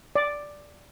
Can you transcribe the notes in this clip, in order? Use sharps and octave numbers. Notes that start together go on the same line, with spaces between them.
D5